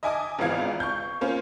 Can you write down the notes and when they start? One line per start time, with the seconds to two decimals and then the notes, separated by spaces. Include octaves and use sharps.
0.03 D#5 E5 G#5 A5 D6 D#6
0.39 G#1 C#2 E3 B3 F5 G#6
0.80 C#6 G6
1.21 A#3 C4 C#4 F4 C5